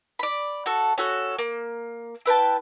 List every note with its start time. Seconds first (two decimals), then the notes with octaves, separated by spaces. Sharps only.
0.19 D5 B5
0.66 F#4 A4
0.98 C#4 F#4 A4 F#6
1.38 A#3
2.26 E4 B4 G5 A5